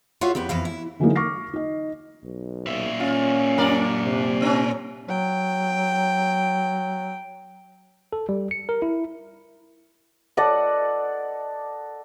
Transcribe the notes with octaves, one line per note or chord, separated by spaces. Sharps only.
F4 F#4 C#5 E5 F5
F2 B3 G4 B4
F2 E3 B4 F5
E4
D3 E3 F#3 G#3 A#3 D#4
C#6 D6 F6 A#6 C7
D#4 D#5
B1
A#2 E5
C#4 F4
F#2 A#4 D5
C3
C4 C#4
F#3 G5
A4
G3
C#7
A#4
E4
A4 D5 D#5 F#5